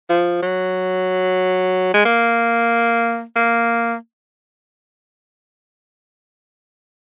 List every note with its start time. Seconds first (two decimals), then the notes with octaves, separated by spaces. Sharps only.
0.10 F3
0.43 F#3
1.94 G#3
2.05 A#3
3.36 A#3